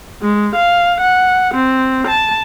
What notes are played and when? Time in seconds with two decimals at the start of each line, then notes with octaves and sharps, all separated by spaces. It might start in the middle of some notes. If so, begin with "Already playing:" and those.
0.22 G#3
0.55 F5
1.01 F#5
1.54 C4
2.08 A5